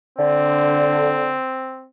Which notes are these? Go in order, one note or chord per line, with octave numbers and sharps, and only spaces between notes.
D3 C4